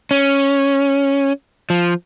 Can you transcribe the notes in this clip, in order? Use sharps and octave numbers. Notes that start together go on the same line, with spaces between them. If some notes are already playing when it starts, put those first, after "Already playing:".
C#4
F3